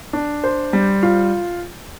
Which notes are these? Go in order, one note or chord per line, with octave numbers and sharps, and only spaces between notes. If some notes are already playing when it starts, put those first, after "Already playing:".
D4
C5
G3
F4